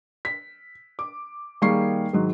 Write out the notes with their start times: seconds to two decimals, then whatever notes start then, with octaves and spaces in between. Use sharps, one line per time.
0.25 B6
0.99 D6
1.62 D#3 G3 A#3 G#4 C#6 C7
2.13 G#2 D#3 F#3